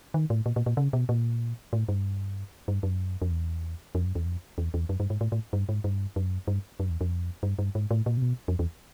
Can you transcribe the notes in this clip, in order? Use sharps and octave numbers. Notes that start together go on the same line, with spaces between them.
D#3
A2
A#2
A#2
A#2
C#3
B2
A#2
A2
G2
G2
F#2
F2
E2
F2
F#2
E2
F2
E2
E2
F#2
G2
G#2
A2
A2
G2
G#2
G2
F#2
G2
F#2
E2
F2
G2
G2
G#2
A2
A#2
C3
B2
F2
E2